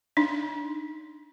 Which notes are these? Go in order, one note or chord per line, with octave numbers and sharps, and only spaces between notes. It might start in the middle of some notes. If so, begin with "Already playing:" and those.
D4 D#4